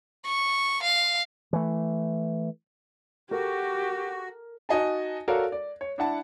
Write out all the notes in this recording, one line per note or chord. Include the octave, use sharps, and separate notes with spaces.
C#6
F5
E3 A3
F#4 G4 A4 A#4
D#4 F#4 D#5 G#5 A5
F#4 A4 A#4 C#5 D5 F5
D5
C#5
D4 E4 F#5 A5